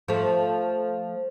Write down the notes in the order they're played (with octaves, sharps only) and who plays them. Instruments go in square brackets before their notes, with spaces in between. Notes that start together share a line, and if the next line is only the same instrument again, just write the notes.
[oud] F3 A3